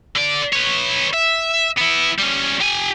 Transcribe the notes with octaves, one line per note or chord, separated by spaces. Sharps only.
D3 D5
B4 C#5
E5
B3 E4
G3 C#4
G4 G#5